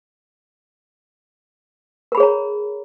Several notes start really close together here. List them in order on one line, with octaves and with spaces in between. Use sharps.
A#4 B5 G#4 C#5 A#5